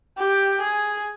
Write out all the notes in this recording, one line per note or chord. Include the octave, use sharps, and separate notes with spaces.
G4
G#4